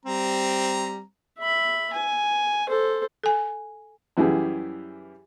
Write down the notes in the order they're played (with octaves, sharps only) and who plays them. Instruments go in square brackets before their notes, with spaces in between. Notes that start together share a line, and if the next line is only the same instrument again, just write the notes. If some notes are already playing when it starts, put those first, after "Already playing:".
[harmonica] G3 C4 A#5
[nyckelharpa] E5 B5
G#5
A4 C5
[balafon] A4 G#5
[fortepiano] F#2 E3 G3 G4 G#4